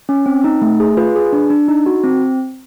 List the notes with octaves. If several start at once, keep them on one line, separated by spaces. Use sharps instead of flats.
C#4
C4
D#4
A3
G#4
F4 B4
G#4
D4
D4
D#4
F#4
C4